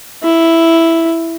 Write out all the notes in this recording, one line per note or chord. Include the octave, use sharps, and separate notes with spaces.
E4